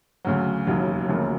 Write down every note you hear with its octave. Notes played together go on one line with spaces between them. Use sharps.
D2 C#3 F#3
E1 D#2 C#3 F#3
E1 D2 C#3 F3 A#3